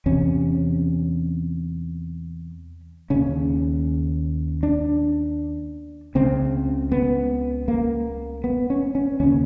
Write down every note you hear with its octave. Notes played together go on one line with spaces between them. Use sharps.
E2 C3 C#4
D#2 C#3 C#4
D4
C#2 C#3 C4
B3
A#3
B3
C#4
C#4
D#2 C#3 C#4